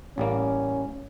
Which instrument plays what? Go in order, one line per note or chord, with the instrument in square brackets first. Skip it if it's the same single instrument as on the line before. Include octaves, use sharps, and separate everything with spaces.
[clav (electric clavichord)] A1 G3 A#3 [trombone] C#4